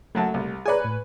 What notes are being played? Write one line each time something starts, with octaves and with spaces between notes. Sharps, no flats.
F#2 F#3 A3 A5
C2
G#4 B4 C#5 D5 G#5 A#5
A2